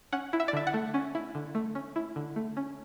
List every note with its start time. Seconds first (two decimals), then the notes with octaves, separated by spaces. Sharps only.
0.13 C#4 F#5
0.33 E4
0.40 E5
0.48 D5
0.53 D3 E5
0.67 F#5
0.74 A3
0.94 C#4
1.15 E4
1.35 D3
1.55 A3
1.75 C#4
1.96 E4
2.16 D3
2.36 A3
2.57 C#4